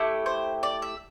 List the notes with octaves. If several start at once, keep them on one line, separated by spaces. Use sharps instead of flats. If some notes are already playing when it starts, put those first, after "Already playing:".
Already playing: A3 E4 G4
C5
D5
E5